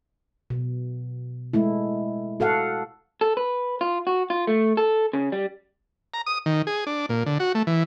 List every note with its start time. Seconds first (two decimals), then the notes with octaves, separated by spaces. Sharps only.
0.50 B2
1.53 G#3 A3 E4
2.40 F#4 A4 F5 F#5
3.21 A4
3.37 B4
3.81 F4
4.07 F#4
4.30 F4
4.47 A3
4.77 A4
5.13 C#3
5.32 G3
6.14 A#5
6.26 D#6
6.46 D#3
6.67 G#4
6.87 D4
7.09 A#2
7.26 D3
7.40 F#4
7.55 A3
7.67 E3